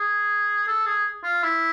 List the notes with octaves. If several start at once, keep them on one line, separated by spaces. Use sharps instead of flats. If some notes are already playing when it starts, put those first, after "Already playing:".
Already playing: G#4
A4
G#4
F4
E4